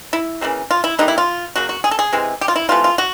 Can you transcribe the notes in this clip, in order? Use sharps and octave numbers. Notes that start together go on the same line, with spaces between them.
E4
C#3 E3 G3 A#3
F4
E4
D3 G3 A#3 D#4
E4
F4
C#3 F#3 A#3 F#4
F#4
G#4
A4
G#4
C3 E3 G#3
G4
F4
E4
C3 E3 A3 F4
F4
F#4